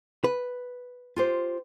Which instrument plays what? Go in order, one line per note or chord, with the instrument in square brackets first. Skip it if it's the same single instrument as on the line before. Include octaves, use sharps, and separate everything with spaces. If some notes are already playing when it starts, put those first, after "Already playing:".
[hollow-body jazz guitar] B4
[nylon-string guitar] F4 G4 C5